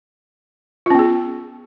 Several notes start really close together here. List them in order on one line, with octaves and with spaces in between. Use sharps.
F4 C#4 B3 G#4